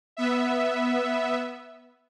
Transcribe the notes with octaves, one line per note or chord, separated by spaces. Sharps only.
B3 E5